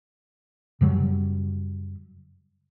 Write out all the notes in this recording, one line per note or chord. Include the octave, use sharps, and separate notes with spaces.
F#2 C#3 F#3 G3